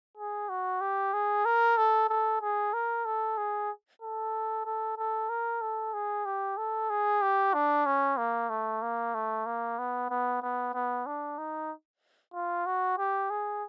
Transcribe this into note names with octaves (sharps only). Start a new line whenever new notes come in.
G#4
F#4
G4
G#4
A#4
A4
A4
G#4
A#4
A4
G#4
A4
A4
A4
A#4
A4
G#4
G4
A4
G#4
G4
D4
C#4
A#3
A3
A#3
A3
A#3
B3
B3
B3
B3
D4
D#4
F4
F#4
G4
G#4